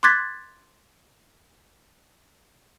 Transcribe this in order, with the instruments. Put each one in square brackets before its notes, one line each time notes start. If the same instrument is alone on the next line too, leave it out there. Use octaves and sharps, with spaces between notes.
[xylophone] C6 D6 F#6 G#6 A6 B6